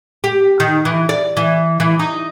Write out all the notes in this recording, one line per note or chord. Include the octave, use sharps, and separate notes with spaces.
G4
D#3
E3
D5
E3
E3
D#4